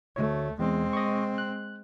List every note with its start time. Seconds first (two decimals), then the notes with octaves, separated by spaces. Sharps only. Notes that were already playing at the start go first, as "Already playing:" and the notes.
0.16 D2 A3 C#5
0.59 E2 G#3 C4
0.93 D#5 C#6
1.38 F#6